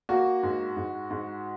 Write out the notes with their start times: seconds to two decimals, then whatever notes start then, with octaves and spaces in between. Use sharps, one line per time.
0.09 A#3 F#4
0.43 G#2
0.77 G#2
1.11 G#2